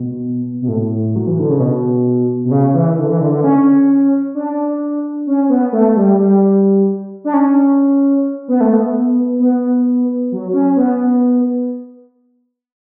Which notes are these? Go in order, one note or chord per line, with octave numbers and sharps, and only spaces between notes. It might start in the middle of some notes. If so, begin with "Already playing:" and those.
Already playing: B2
B2
A2
F#3
E3
D3
C#3
B2
B2
C#3
E3
D3
E3
D3
D3
C#4
D4
C#4
B3
A3
G3
G3
D4
C#4
B3
A3
B3
B3
F#3
C#4
B3